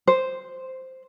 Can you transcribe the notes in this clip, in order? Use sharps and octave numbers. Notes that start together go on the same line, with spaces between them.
C5